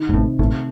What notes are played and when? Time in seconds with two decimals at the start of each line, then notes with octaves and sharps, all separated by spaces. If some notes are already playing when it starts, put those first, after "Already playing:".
Already playing: D#3
0.09 G#2
0.13 A1 A2 C3
0.39 A1 A2 A3